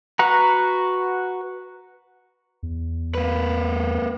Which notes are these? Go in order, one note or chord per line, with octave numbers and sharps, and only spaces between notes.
F#4 B4 F#5 A#5
E2
A#3 B4